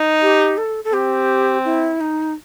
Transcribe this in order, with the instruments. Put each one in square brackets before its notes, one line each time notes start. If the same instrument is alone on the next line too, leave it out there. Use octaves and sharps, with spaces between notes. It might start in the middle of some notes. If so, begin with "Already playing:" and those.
Already playing: [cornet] D#4
[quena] G4
A4
A4
[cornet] C4 [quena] G4
[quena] E4
D#4